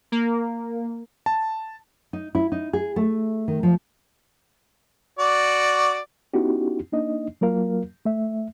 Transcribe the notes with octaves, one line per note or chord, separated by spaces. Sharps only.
A#3
A5
D#4
E4
D#4
G#4
A3
D#3
F3
F#4 D5
B3 C#4 D#4 E4 F#4 G4
A#3 D4 D#4 D#5
F#3 A#3 F4 A#4 F5
A3 E5